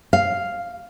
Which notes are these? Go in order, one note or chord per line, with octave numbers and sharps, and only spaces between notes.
F5